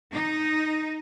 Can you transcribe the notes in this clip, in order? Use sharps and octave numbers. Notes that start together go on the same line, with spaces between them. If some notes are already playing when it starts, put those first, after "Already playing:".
D#4